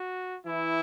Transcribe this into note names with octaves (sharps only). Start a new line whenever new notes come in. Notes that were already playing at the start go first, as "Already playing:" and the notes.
Already playing: F#4
E3 E4